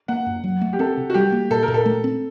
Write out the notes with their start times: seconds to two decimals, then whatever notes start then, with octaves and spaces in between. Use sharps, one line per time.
0.08 A#3 F#5
0.26 F#2
0.44 F#3
0.61 A3
0.73 G4
0.79 C4 A4
0.97 C3
1.10 F#4
1.14 G3 G4
1.32 A#3
1.50 A#2 A4
1.63 A#4
1.68 A#2
1.74 A4
1.86 A3
2.04 C4